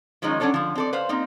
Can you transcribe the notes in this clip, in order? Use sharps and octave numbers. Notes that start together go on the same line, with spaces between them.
D#3 F3 F#3 G#3 C#4 D#4
F#3 C#4 D4 A4 C#5
D3 F3
C4 A4 D5
B4 C5 F5
A#3 C4 D#4